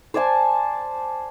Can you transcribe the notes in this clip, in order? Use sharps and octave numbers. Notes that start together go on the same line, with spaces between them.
C5 D5 G#5 A5